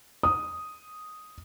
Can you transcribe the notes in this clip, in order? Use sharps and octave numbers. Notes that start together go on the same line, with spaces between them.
D#6